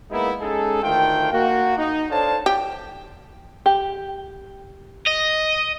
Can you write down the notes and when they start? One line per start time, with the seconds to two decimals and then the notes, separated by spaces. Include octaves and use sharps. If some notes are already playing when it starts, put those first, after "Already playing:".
0.11 G#3 A#3 B3 D#4 E4
0.41 G#3 C#4 D#4 G#4 A4
0.82 D2 D#3 A3 F4 G5
1.33 A#3 F#4
1.77 D#4
2.10 D4 A4 C5 C#5 F5 A5
2.46 G4
3.66 G4
5.07 D#5